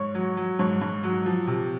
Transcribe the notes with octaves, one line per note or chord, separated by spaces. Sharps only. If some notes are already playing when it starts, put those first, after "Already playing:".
Already playing: G#2 C#5
F#3
F#3
G#2 C#5
G#2
F#3
F3
C3